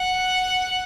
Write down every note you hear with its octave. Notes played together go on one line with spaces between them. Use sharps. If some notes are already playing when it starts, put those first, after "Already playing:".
Already playing: F#5